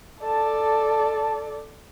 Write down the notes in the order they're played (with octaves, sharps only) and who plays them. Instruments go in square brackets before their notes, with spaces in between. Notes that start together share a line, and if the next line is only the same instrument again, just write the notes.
[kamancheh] A4 D5 [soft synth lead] A5